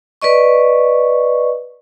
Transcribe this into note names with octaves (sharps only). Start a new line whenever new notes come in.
B4 D5 D#5 C#6